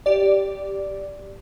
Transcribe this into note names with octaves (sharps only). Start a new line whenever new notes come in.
G4 D5